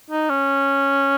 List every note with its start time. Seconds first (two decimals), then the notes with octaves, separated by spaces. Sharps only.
0.10 D#4
0.30 C#4